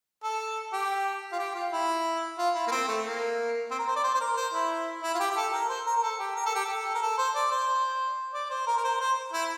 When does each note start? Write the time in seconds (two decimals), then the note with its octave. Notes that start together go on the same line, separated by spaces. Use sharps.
0.23 A4
0.73 G4
1.32 F4
1.39 G4
1.55 F4
1.72 E4
2.38 F4
2.55 E4
2.67 A#3
2.72 C4
2.88 A3
3.05 A#3
3.71 C4
3.79 A#4
3.87 C5
3.96 D5
4.04 C5
4.14 C5
4.21 A#4
4.37 C5
4.54 E4
5.03 E4
5.15 F4
5.20 G4
5.31 G4
5.36 A4
5.53 A#4
5.69 C5
5.86 A#4
5.97 A#4
6.03 A4
6.19 G4
6.36 A#4
6.46 A4
6.56 G4
6.65 A4
6.95 A#4
7.02 A4
7.18 C5
7.35 D5
7.51 C5
8.34 D5
8.50 C5
8.67 A#4
8.78 A#4
8.84 C5
9.00 C5
9.33 E4